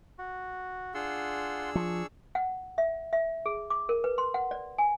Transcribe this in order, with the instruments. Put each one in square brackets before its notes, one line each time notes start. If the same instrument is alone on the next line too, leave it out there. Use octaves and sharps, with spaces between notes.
[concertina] F#4
[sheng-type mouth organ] D4 G#4 E6 [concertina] F4 F#5 C6
[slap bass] F3 [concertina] C#6
[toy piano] F#5
E5
E5
G#4
D6
A#4
B4
C6
F#5
D5
G#5